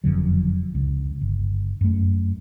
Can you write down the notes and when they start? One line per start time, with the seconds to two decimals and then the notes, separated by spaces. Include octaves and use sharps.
0.04 F#1 F2 D3 F#3
0.75 C#2
1.21 G1
1.81 F#2 A3